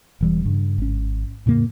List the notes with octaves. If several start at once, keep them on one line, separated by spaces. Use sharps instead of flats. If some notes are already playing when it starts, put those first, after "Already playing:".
E1 E3 G3
G2 C#3
G#1 C#4
E2 A2 C#3 A#3